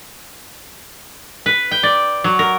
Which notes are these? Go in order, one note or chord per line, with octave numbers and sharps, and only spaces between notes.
B4
G5
D5
F#3
A#4